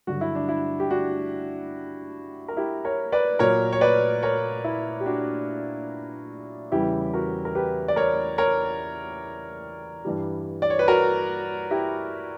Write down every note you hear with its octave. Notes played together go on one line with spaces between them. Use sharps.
G2 D3 F#3 F#4
E4
D4
E4
G4
D4 F#4
A#4
E4 G4
A#4 C#5
B4 D5
A#2 F#3 A#4 C#5
C#5
B4 D5
A#4 C#5
E4
G4
D4 F#4
E2 C#3 E3 G3 E4 G4
F#4 A#4
A#4
G4 B4
D5
A#4 C#5
A#4 C#5
G2 E3 G3
D5
C#5
B4
F#4 A#4
E4 G4